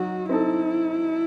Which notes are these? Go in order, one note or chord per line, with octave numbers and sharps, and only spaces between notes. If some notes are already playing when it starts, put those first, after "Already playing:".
Already playing: F#3 D#4 F#4
C4 D#4 E4 A4